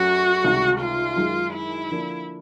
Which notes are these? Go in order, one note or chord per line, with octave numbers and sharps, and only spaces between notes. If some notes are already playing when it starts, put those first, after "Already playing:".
Already playing: F#2 F#3 A3 C#4 F#4
C#2 C3 D#3 G3
F4
F#2 D#3 G#3
E4
D3 F3 A#3 D4